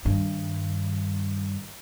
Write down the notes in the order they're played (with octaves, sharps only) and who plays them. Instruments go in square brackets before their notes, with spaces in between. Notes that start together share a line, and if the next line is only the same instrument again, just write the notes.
[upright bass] G2 D#3